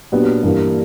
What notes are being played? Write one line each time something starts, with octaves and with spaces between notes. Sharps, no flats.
A#2 F#3 B3 D4 G4
G2 E3 G3 A#3